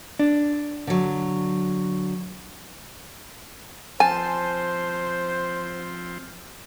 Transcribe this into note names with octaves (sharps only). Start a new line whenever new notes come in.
D4
D3 F#3
F3 C4 C5 G#5 A5